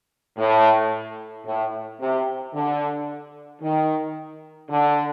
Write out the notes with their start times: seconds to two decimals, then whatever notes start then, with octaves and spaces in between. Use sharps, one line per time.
0.38 A2
1.46 A2
2.01 C3
2.54 D3
3.62 D#3
4.70 D3